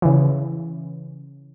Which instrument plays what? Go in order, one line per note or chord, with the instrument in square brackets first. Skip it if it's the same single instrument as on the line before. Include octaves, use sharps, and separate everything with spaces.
[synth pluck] C#3 E3